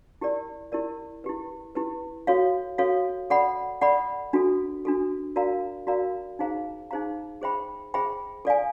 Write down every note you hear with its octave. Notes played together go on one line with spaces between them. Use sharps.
E4 G4 A#4 D5
E4 G4 A#4 D5
E4 G4 B4
E4 G4 B4
F#4 A4 C#5 F5
F#4 A4 C#5 F5
A4 D5 F#5 B5
A4 D5 F#5 B5
D4 F#4 A4
D4 F#4 A4
F#4 A#4 D5 F5 A#5
F#4 A#4 D5 F5 A#5
D#4 G#4 C5 F5 A#5
D#4 G#4 C5 F5 A#5
G#4 C5 E5 G5 B5
G#4 C5 E5 G5 B5
A4 D5 F5 G#5